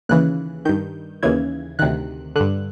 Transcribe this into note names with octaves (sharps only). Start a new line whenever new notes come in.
D#2 C#3 E3 F#6
G2 D#3 G6
D#2 C#3 E3 G#6
D2 C3 D#3 F#6
G2 D3 F#6